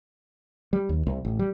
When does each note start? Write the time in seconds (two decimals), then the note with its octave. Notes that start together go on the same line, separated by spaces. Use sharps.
0.73 G3
0.89 D#2
1.07 C2
1.25 A1
1.39 G3